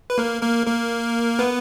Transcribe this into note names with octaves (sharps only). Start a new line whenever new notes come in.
B4
A#3 A#4
A#3 A#4
A#3 A#4
B3 B4